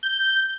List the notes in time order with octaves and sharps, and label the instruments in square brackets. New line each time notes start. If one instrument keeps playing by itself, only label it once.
[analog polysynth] G6